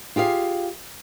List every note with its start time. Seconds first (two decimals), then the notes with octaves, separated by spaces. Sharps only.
0.16 F4 G4 G#4 F5